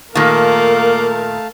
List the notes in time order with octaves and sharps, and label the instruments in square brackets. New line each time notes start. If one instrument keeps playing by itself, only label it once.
[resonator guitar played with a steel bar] A#2 D#3 [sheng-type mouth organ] A3 F5 A5 [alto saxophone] A#3 [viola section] A#4